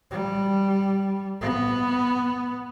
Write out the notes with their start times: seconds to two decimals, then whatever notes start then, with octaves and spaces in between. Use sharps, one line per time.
0.11 G3
1.41 B3